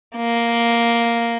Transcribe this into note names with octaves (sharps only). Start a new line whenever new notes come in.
A#3